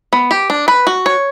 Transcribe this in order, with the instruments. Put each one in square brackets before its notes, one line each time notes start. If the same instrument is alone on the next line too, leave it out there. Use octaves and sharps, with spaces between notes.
[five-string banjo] B3
G4
D4
B4
F#4
C#5